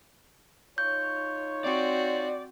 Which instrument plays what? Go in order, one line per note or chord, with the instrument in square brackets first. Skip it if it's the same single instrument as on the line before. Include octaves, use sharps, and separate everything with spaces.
[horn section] D#4 F4 C#5 [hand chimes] G6
[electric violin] C4 F#4 [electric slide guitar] D5